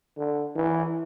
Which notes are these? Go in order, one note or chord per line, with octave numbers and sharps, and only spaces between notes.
D3
E3